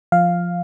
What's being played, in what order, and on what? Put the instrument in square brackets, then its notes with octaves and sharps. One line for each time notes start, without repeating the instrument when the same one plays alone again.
[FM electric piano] F3 F5